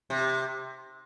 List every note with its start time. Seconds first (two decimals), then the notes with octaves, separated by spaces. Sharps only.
0.10 C3